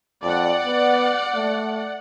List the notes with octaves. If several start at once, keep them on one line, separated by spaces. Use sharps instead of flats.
F2 D5 F#5
B3
A3